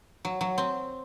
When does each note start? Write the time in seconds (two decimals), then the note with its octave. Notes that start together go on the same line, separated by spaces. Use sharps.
0.25 F#3
0.41 F#3
0.58 C4